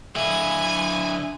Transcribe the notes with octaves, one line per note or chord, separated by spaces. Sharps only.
D3 E4 G#5